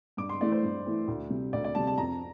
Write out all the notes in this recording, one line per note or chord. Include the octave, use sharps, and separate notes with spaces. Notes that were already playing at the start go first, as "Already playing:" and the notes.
G2 D6
C6
E3 A3 E4 D5
C5
G2
E3 A3 E4
D2
C3 G3
D2 D5
D5
C3 G3 A5
A5
F2 A#5